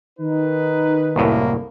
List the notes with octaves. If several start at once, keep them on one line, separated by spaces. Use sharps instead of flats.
D#3 D#4 B4
C2 F#2 A2 A#3